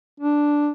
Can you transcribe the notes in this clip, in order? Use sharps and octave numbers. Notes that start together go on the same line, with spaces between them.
D4